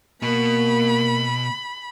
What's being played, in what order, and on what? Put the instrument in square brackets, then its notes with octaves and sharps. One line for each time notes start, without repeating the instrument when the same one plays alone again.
[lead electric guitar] B2 [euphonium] A#3 [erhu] B5